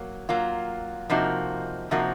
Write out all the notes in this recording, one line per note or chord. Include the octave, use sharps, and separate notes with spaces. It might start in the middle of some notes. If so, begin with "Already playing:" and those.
Already playing: F#3 A#3
F#3 A#3 F4
C3 F3 A#3 D#4 F#4
C3 F3 A#3 D#4 F#4